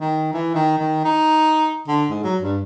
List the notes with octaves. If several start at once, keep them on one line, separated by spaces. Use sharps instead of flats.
D#3
E3
D#3
D#3
D#4
D3
G#2
F#3
G2